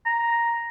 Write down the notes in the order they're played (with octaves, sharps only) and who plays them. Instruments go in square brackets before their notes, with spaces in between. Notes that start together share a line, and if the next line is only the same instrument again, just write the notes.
[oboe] A#5